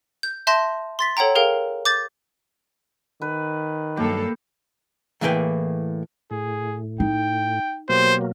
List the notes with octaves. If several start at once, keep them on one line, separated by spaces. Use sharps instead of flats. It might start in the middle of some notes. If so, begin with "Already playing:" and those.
G6
E5 A5 C6 G6 A#6
C6 A6 B6
A4 C#5 F#5 G5 A#5
G#4 A#4 F5 G5
D6 G6 A6
D#3 B4
G2 F#3 A#3 G4 A4
A2 E3 A#3 G#4 B4 G5
A2 G#4
D#4 G5
B2 F#3 A#3 G4 C5